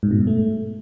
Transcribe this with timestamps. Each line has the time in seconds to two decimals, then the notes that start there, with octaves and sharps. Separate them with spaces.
0.03 G#2
0.11 B2
0.19 G2
0.27 A3